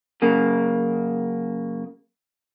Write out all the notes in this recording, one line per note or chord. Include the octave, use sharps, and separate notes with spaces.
F#2 C#3 A#3